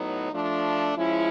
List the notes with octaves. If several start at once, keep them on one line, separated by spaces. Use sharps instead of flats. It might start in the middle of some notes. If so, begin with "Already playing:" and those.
Already playing: A2 F#3 B3 D#4
F3 A3 D4
F3 G#3 C#4 E4